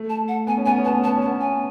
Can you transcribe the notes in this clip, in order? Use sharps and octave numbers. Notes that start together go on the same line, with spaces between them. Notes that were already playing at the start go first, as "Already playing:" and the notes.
Already playing: A3
A5
F#5
B3 G#5
C#4
B3 G#5
C#4
B3 A5
C#4
A5
B3
C#4
A5
B3
G#5